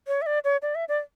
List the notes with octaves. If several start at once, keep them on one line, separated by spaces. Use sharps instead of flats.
C#5
E5
D5
C#5
D5
E5
D5